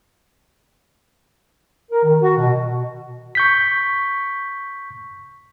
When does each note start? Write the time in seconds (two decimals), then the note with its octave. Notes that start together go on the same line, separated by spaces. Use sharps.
1.91 A#4
2.04 D#3
2.22 F#4
2.38 B2
3.35 C#6 G6 B6